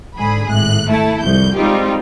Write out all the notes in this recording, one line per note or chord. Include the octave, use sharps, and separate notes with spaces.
G#2 D3 G#4 B5
G#1 A2 F#6
A3 E4 A5
C2 F2 G6
G3 G#3 C4 D#4 F4 G4